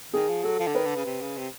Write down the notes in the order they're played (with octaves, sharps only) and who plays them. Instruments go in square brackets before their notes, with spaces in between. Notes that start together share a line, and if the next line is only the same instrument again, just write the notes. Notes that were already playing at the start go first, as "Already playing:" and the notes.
[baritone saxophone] D#3 [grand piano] G#4
[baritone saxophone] F3
[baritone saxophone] F#3 [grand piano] A4
[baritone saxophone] F3
D3
[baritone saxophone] D#3 [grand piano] B4
[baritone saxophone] D3
C#3
C3
C#3
C3